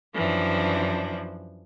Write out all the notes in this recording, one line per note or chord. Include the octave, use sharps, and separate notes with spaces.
F#2 E3 F3 D4